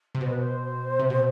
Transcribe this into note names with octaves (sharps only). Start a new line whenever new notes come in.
C3
B2 C5
B4
C5
C3
B2